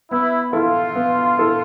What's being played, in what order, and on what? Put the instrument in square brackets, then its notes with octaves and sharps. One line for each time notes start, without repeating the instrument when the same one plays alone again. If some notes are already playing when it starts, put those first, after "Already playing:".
[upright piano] B3 [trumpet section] E4
[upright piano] E4 A4 [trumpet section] F4
[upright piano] B3
E4 A4